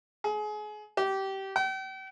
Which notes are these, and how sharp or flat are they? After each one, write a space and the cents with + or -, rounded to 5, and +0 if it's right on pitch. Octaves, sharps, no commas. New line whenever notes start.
G#4 +30
G4 -20
G5 -40